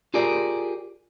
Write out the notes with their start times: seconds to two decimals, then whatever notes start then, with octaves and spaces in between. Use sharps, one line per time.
0.14 F4 G4 G#4 A#4 D5